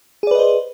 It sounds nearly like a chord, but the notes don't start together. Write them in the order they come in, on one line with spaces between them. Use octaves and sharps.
G#4 D5 B4 D#5 C5